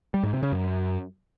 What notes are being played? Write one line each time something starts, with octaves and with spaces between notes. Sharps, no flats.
G3
G#2
C3
C#3
F#2